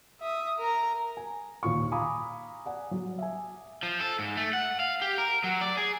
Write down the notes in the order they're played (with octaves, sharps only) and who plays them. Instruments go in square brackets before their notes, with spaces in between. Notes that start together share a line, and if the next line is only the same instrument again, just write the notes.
[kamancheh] E5 D#6
A#4 A#5
[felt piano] G#5
D#2 A#2 C#6
F5 G#5 A#5 B5 D6 D#6
D5 F#5 G#5
F#3 F#4
E5 G#5
[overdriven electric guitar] F3
A4
G#2
A3
F#5
F5
G4
A#4
F#3
D5
G#4